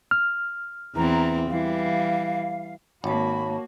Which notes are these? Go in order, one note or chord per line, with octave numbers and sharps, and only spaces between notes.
F6
E2 E3 C4 A#5
E3 G3 F5
G#1 A#3 F#4 C#5 A5 B5